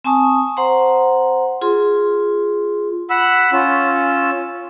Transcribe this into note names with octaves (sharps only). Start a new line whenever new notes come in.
C4 G#5 A5 C#6 D#6
C5 F#5 A#5 C6
F4 G#4 C6
F#5 B5 E6
C#4 F4 E6